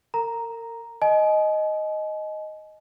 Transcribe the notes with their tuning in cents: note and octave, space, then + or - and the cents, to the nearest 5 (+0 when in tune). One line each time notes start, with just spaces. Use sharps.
A#4 -35 A#5 +0
D#5 +0 G#5 +40